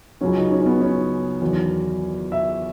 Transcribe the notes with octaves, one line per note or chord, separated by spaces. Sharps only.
C#2 C#3 F#3 C#4
D#4
C#4
C#4
B3
C#4
E2 D#3 F#3
E5